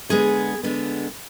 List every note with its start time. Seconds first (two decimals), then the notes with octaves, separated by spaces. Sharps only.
0.09 D3 G#3 B3 G#4
0.63 D3 G#3 B3